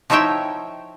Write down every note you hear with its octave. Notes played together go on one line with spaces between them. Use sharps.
F3 D#4 E4 C#5 E5 G5